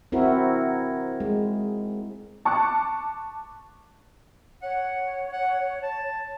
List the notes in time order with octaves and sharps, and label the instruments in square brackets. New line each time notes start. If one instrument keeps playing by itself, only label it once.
[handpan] C4 E4 F#4 A#4
G#3
[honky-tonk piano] A5 C#6 D6 F#6
[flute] C#5 [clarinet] F#5
[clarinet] F#5
A5